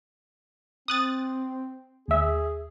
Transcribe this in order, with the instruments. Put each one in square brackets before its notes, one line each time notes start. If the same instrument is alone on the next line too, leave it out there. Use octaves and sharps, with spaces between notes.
[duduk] C4 [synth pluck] D#6 F#6 A6
[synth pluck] D#2 E5 [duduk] G#4